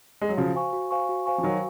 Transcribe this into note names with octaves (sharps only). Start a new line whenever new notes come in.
G#3
F#3
C#3 F3 F#4
C5 F5 G#5 C#6
F#4
C5 F5 G#5 C#6
F#4
C5 F5 G#5 C#6
F3
D#3 F#3 F#4